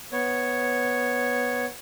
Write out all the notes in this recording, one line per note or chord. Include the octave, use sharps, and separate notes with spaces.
B3 C#5